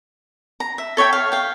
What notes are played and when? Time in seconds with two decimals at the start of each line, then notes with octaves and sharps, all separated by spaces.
0.60 A#5
0.78 E5
0.97 A4 C#5 E5 G5
1.13 F5
1.32 F5 G5